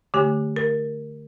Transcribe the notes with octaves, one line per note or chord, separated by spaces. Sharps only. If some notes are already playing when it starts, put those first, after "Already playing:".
D3 A3 G4
A#4